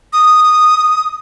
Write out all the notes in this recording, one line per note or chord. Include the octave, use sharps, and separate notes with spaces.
D#6